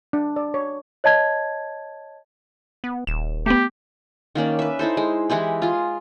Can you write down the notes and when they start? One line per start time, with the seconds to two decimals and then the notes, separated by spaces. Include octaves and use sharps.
0.13 D4
0.36 D5
0.54 C#5
1.04 C#5 D#5 A5 G#6
2.84 B3
3.07 D#1 E7
3.46 A3 B3 G4
4.35 D#3 A#3 C#4 D5
4.59 B4 E5
4.79 D#4 E4 A4 C5
4.97 G#3
5.30 E3 G#3 E4 G4
5.62 F4 G#4